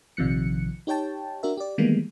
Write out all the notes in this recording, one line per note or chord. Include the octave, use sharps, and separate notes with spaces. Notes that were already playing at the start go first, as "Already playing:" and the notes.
A#1 C3 D#3 F3 F#6 C#7
D#4 G4 C#5 G5 A5
D4 F#4 A#4 E5
G4 D5
D#3 E3 G3 G#3 A#3 B3